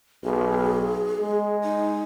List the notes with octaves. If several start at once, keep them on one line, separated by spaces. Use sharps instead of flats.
B1 G#4
G#3
D#4